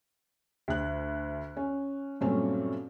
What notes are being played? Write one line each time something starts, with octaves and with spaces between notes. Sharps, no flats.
D2 F#6
C#4
G2 A#2 F#3 A3 C4 C#4